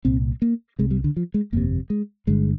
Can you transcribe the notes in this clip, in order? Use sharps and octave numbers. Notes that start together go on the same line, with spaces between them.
C2 A#2 C4
A#3
C2 C3 G#3
G3
D3
F3
G#3
G1 F2 C3 A#3
G#3
G1 G2 D3 G#3